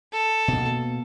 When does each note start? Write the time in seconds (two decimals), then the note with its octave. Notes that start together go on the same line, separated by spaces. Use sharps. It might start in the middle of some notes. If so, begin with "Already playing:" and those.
0.13 A4
0.48 B2 A#3